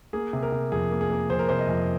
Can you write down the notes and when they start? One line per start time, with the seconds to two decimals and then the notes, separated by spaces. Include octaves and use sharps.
0.13 A#3 G#4
0.33 C3
0.43 A#4
0.52 C3
0.72 F2 G#4
0.91 A#3
1.01 G#4
1.11 A#3
1.30 F2 C5
1.39 A#4
1.49 C3 C5
1.59 D#5
1.69 F2